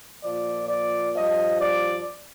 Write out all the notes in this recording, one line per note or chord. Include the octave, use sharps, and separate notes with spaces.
A#2 F3 D5
D5
G2 F3 D#5
D5